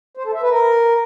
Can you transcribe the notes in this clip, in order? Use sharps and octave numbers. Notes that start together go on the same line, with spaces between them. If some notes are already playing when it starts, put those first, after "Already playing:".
C5
A4
E5
B4
A#4